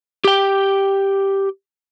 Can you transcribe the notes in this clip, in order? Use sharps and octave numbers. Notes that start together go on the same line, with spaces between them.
G4 G5